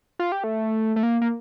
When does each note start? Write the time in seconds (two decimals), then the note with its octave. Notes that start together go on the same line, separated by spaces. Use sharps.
0.19 F4
0.32 G4
0.44 A3
0.96 A3
1.03 A#3
1.22 A#3